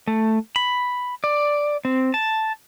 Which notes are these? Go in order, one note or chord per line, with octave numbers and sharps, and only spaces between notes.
A3
B5
D5
C4
A5